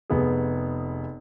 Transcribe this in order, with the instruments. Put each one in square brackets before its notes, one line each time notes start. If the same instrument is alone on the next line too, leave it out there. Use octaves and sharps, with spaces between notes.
[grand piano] F1 B3 G#4